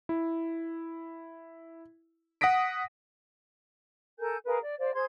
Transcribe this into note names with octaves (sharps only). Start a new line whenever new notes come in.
E4
F#5 D#6 A#6 B6 D7
A4 A#4 G#5 G6
G#4 A#4 B4 F5
D5
C5 D5 F5
G#4 C5 C6 G#6